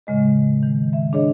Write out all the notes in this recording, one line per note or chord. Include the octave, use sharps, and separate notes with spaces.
A2 C#3 G#3 D#5
D#3
E5
D4 G#4 C#5 D#5